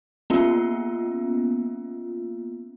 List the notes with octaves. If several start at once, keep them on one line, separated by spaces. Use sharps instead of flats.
A#3 B3 C#4 F4